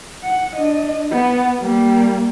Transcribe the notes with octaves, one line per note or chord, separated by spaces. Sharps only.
F#5
D4 D#5
B3
G3 A#3